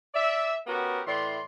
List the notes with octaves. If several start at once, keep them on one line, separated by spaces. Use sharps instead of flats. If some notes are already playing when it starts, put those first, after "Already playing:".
D5 E5
B3 C#4 F#4 G4 A#4
A2 E3 D5 C6